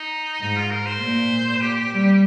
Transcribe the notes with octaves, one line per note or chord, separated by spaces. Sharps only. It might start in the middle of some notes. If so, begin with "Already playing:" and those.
Already playing: D#4
G#2 D#4
F4
A#4
C5
A#2
G4
G3